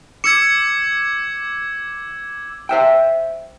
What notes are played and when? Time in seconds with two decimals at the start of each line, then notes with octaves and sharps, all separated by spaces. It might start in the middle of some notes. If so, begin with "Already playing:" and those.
0.24 D6 E6 G#6 C#7
2.69 C5 E5 G5